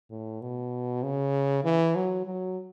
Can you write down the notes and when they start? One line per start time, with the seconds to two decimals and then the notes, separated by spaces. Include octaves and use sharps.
0.11 A2
0.41 B2
1.03 C#3
1.64 E3
1.95 F#3
2.26 F#3